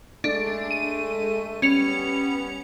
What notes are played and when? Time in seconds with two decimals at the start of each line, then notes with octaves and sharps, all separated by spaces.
0.24 G#3 A3 D4
0.71 D#7
1.62 G3 B3 C#4 C#7 F7